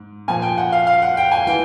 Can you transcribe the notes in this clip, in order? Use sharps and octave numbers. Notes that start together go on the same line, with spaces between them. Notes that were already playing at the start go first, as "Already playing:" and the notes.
Already playing: G#2
A#2 F3 G#5
G5
F#5
F5
F5
F#5
G5
G#5
E3 G5